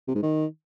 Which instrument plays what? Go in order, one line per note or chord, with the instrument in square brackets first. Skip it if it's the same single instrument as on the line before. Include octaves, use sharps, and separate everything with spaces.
[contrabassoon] C3
G#2
D#3